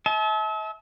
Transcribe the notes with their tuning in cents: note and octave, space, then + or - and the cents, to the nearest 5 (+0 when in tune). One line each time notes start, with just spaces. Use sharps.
E5 -40 A5 -35